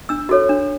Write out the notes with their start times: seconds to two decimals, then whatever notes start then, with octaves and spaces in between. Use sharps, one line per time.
0.09 D4 E6
0.29 F#4 A4 C#5
0.49 D4